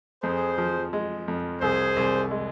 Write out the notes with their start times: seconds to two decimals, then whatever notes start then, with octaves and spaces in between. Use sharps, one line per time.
0.23 F2 G#4 C5
0.58 F3
0.93 G#3
1.28 F2
1.61 C2 G#4 C5
1.97 C2
2.31 G#3